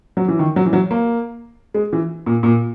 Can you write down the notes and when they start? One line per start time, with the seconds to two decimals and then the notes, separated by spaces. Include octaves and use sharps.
0.17 F#3
0.28 E3
0.39 D#3
0.56 F#3
0.66 E3
0.73 F#3
0.91 A#3
1.74 G#3
1.93 E3
2.26 A#2
2.43 A#2